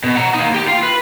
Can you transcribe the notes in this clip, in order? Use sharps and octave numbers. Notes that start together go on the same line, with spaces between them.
B2
F#5 A#5
A#3 D#4
G4 G5
F4 F5
B4